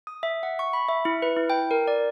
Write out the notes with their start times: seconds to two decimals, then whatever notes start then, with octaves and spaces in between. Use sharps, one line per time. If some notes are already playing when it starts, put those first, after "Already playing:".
0.07 D#6
0.23 E5
0.43 F#5
0.59 C#6
0.73 B5
0.89 E5
1.05 E4
1.22 B4
1.37 E4
1.50 G5
1.71 A#4
1.87 D5